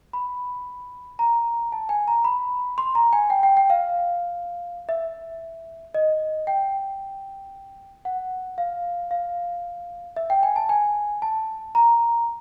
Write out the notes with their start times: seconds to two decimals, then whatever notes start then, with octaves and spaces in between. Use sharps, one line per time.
0.13 B5
1.19 A#5
1.72 A5
1.89 G#5
2.08 A#5
2.24 B5
2.78 C6
2.95 A#5
3.13 G#5
3.30 G5
3.43 G5
3.57 G5
3.70 F5
4.89 E5
5.94 D#5
6.47 G5
8.05 F#5
8.58 F5
9.11 F5
10.16 E5
10.30 G5
10.43 G#5
10.56 A5
10.69 G#5
11.22 A5
11.75 A#5